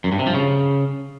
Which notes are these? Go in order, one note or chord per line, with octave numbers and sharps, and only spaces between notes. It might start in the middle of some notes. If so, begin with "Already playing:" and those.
F#2
G2
C3
F3
C#3